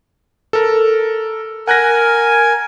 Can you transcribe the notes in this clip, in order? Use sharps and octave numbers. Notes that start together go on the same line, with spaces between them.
A4 A#4
A#4 F#5 G#5 F#6 A#6